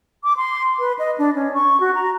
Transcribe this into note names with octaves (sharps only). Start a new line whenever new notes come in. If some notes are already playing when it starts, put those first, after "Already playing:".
D6
C6
B4
D#5
D4
C#4
C#6
F#4
A#5